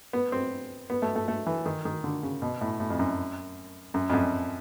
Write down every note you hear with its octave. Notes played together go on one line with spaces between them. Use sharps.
B3
C4
B3
A3
A3
A3
E3
D#3
D#3
D3
C#3
B2
A2
A2
F2
F#2
F#2
F2
F#2